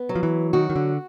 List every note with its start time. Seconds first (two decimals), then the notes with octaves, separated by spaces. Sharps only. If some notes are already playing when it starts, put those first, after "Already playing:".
Already playing: B3
0.09 F#3
0.15 F3
0.23 E3
0.53 D#3 F#4
0.70 D#3
0.76 D3